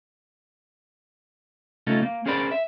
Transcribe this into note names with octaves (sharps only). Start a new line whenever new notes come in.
C#3 A3 C#4 D#4 F4 A4
A#3
C#4 G#4 A#4 C5 D5 B5
E5